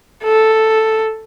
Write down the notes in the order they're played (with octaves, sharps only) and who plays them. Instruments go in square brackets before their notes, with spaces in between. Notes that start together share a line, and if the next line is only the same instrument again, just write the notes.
[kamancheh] A4